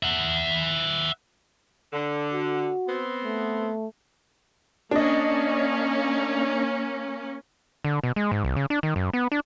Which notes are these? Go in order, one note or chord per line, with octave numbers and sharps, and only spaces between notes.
E5 F#5
D3
F#4
B3 C4
A3
A#3 C#4 D4 D#5
D3
B2
G#3
G#2
C2
C#3
D4
D#3
F#2
B3
D4